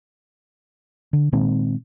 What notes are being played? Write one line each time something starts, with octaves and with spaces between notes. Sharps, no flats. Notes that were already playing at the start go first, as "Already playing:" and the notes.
D3
A#2 D#3 G#3 C4